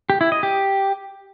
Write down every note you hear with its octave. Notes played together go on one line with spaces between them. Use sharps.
G4
E4
D#5
G4